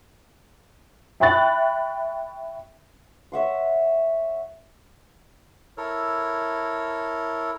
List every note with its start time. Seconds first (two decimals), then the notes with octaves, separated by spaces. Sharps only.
1.20 E5 G5 B5 C#6 F#6 A6
3.32 C#5 E5 F#5 C6
5.77 E4 A4 A#4 C#5